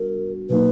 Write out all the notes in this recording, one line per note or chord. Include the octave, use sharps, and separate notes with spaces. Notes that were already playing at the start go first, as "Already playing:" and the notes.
Already playing: G3 B3 D4 F#4 A#4
B2 F#3 A#3 D#4 B4